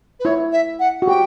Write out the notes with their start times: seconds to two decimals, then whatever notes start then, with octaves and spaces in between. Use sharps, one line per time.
0.20 B4
0.25 E4 C#5
0.52 E5
0.80 F#5
1.02 F#4
1.08 G4 G5